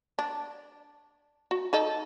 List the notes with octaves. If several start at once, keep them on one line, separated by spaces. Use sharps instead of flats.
D4
F#4
D#4 A4 D#5